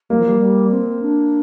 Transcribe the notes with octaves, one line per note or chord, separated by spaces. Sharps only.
G3 A#3
F3
G3
G3
C4
D4